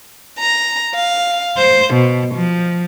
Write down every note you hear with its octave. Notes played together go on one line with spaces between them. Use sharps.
A#5
F5
C5
B2
F3